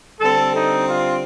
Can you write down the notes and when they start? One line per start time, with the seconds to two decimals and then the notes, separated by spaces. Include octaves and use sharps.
0.20 D3 G3 C4 A4
0.53 D#4
0.86 F4